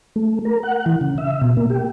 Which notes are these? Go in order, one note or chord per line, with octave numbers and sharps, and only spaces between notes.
A3
A#4
F#5
E3
C#3
E5
B2
A#3
G4